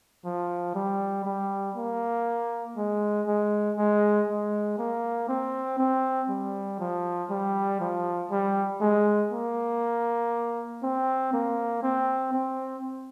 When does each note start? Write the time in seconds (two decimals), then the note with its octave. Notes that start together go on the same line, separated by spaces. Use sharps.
0.25 F3
0.75 G3
1.25 G3
1.76 A#3
2.76 G#3
3.27 G#3
3.77 G#3
4.28 G#3
4.78 A#3
5.28 C4
5.79 C4
6.29 G3
6.80 F3
7.30 G3
7.80 F3
8.30 G3
8.81 G#3
9.31 A#3
10.83 C4
11.33 A#3
11.83 C4
12.33 C4